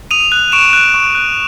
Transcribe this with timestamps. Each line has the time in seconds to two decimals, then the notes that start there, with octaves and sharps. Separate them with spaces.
0.11 D#6 D#7 F7
0.32 F#6
0.52 C#6 D7 E7
0.73 F#6
0.94 C#6
1.15 F#6